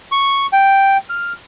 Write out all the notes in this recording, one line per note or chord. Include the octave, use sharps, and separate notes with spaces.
C#6
G5
F6